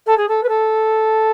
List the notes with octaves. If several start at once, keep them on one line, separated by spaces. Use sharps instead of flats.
A4
G#4
A4
B4
A4